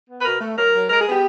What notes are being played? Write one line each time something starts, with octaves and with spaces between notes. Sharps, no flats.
B3
B4
B2 A#4
A3
F#3 A#4
F#3
G#3 A#4
G#4
B3
G4